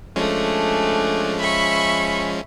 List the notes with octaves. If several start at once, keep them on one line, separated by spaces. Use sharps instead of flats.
F3 G#3 A3 C#4 D4
E5 B5 C#6